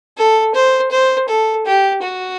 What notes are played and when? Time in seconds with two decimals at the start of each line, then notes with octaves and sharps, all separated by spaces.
0.17 A4
0.54 C5
0.91 C5
1.28 A4
1.66 G4
2.02 F#4